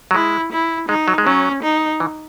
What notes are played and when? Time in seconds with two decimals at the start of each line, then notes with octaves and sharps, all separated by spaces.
0.11 F#3
0.14 G#3 E4
0.52 E4
0.88 G#3 D#4
1.08 F#3
1.18 G#3
1.26 F#3 C#4
1.63 D#4
2.00 E3